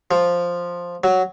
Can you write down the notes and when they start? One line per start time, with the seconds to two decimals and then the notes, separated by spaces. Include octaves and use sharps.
0.11 F3
1.04 F#3